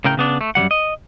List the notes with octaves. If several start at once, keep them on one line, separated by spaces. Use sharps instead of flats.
A2 C#3 A#4 G5
C#3 B3 D4
A3
F#2 F3 G3 F#5
D#5